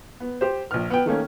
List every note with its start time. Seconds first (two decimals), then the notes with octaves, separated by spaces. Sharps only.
0.20 B3
0.41 G4 C5
0.71 A#1 F6
0.90 B3 G5
1.06 D#3 A3 A#3 C#4